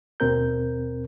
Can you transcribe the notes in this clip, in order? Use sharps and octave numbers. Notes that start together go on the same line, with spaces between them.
D#2 B2 C4 A#4 G6